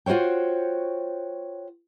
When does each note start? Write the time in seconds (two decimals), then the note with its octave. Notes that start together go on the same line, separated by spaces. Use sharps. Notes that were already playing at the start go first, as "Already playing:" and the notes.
0.06 F4 F#4 C5 C#5 G5